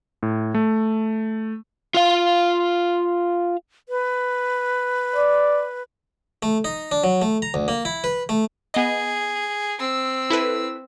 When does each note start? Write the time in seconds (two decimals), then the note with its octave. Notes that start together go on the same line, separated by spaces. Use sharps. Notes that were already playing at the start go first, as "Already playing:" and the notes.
0.23 A2
0.54 A3
1.94 F4 F5
3.89 B4
5.16 D5
6.43 A3
6.65 D#4
6.92 D4
7.04 F#3
7.22 A3
7.42 A#5
7.54 D2
7.68 A#3
7.85 E4
8.04 B4
8.29 A3
8.74 B3 G#4 D#5
9.79 C4 E6
10.30 E4 A4 B4